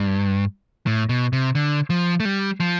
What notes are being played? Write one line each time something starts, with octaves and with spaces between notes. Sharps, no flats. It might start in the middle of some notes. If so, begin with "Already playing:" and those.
Already playing: G2
A2
B2
C3
D3
F3
A3
G3
F3